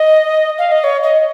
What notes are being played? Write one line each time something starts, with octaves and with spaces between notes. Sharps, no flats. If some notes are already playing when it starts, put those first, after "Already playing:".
Already playing: D#5
F5
D#5
C#5
D#5